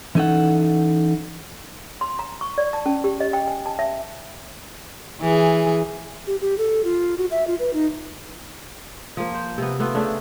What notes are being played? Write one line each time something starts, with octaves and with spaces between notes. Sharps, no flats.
E3 C#4 D#4 G#4 A4 F#5
C6
A#5
C#6
D5
A5
C#4
G4
D#5
G5
G#5
A5
E5
E3 G#4
G4
G4
A4
F4
F#4
E5
F4
B4
D#4
F3 A#3
C5
C3 B3
A3 B3 F4 A4
C#3 A3 D4 E5